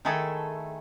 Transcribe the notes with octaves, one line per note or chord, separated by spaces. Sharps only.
D#3 A3 E4 G#4 A4